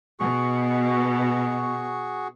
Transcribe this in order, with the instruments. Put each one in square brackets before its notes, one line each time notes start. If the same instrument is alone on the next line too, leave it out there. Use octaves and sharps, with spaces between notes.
[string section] B2 [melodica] F#4 G#4 C#6